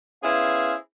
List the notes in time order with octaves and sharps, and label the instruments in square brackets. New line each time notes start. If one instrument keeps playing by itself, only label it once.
[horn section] B3 C#4 E4 G#4 C5 F5